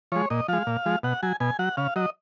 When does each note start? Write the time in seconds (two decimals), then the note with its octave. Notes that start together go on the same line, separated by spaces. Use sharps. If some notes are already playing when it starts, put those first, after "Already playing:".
0.12 F3 G#3 C#5
0.30 A#2 D#5
0.48 F3 G#3 F5
0.67 A#2
0.86 F3 G#3
1.03 B2 F#5
1.23 F#3 G#5
1.40 B2 G#5
1.59 F#3 F#5
1.77 C#3 F5
1.96 F#3 D#5